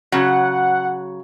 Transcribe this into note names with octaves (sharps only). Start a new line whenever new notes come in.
C#3 F#3 F#5